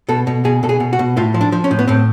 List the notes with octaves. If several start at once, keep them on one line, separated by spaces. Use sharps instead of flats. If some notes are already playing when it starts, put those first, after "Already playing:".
B2 A4
B2
B2 G#4
B2 A4
G#4
B2
F#4
B2
A2 F4
F3
D4
F3
C#4
A2
B3
A2 C4